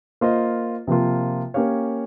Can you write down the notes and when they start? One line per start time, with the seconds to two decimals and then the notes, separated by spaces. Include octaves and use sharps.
0.21 A#3 F4 C5 D#5
0.87 C3 F3 A#3 F4
1.54 A#3 C#4 G4 C#5 F5